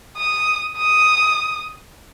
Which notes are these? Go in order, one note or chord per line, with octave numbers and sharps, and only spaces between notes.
D#6
D#6